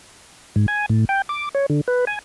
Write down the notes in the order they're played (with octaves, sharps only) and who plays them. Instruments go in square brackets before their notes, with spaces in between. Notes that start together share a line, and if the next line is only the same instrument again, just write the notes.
[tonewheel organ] G#2
G#5
A2
G5
D6
C#5
D3
B4
G#5